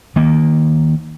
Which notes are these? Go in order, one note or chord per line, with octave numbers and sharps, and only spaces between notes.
D#3 A#3